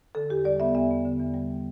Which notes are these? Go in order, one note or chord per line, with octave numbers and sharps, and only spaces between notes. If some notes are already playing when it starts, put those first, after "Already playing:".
D3 A4
E2 G4
G3 D5
B3 E5
E2 E5
B3
D3
E2
G3